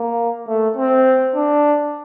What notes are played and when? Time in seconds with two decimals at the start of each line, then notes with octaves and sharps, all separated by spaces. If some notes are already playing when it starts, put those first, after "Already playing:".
Already playing: A#3
0.48 A3
0.77 C4
1.35 D4